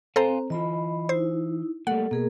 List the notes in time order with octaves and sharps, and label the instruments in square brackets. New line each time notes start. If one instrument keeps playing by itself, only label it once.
[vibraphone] C4 [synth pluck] A4 C5 A#5 [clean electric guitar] F5 G#5 C6
[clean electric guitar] E3 F4 [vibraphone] D#5 B5
[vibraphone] D#4 E4 [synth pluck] C5
[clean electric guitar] G3 A3 A#3 [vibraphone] A4 [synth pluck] F#5
[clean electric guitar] B2 [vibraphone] A#3 G#4 A#4